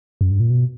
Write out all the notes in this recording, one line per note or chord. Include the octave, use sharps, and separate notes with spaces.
F#2
G2
A#2
B2